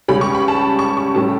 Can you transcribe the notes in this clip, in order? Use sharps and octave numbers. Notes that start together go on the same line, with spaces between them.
C#2 C#3 G3 C#4 B5
C#6
B5
A5
C#6
C#6
A2 G3 C#4 A5